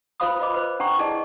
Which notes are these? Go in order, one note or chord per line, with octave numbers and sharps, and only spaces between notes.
F4 B4 C5 F5 B5 D#6
F4 B4 D#5 B5 D6
B4 C5
D4 F#5 A#5 C#6
E4 G#4 D5 D#5 A5